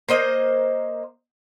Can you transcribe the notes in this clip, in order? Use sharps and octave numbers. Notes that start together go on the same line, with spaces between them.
A#3 C5 D#5